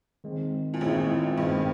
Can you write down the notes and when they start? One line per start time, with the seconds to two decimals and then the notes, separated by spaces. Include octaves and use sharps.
0.24 D#3 G#3 C4
0.74 A#2
0.80 A1 A2 D#3 G#3 C4
1.37 G2 D#3 G#3 C4